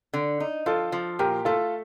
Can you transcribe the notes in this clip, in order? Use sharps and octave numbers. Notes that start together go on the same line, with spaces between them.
D3
D#4
F3 F4 A4
F3
A#2 G4 A#4
A3 F4 A4